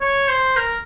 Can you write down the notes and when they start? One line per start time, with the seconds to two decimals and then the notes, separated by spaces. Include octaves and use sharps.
0.01 C#5
0.29 C5
0.56 A#4